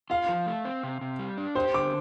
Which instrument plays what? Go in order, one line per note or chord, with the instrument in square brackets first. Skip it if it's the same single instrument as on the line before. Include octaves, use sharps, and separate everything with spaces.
[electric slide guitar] F4 [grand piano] F5
[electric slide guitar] F3
A3
C4
C3
C3
G3
D4
[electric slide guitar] G4 [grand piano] C5
[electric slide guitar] D3 [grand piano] D6